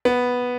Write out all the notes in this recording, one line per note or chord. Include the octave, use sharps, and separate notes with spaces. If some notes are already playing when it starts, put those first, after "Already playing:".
B3